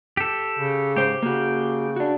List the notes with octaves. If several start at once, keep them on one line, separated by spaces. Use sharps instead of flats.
G4 A4
C#3
G#2 G4 C5
C#3 A#3 F#4
D4 F#4